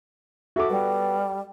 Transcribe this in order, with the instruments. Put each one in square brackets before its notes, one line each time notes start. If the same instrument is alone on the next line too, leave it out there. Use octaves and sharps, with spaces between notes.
[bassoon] E4 [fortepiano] F#4 A4 D6
[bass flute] G3 [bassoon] B3